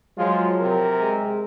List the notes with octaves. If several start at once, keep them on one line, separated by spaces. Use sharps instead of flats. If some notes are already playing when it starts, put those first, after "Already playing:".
F3 F#3 G#3 F4
C3 A#4
G#3